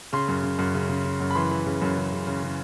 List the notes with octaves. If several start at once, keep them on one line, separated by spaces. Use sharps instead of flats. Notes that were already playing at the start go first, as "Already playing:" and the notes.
C#3 C6
F#2
C#3
F#2
C#3
C#3
C#3
F#2
B5
E3 C6
E3
C#3
F#2
C#3
C#3
C#3
C#3